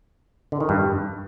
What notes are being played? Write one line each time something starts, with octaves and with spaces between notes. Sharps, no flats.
D3
D#3
G2